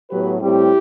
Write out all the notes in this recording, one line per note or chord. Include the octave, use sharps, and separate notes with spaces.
A2 F#3 B3 G4 B4
A2 G3 C4 E4 G4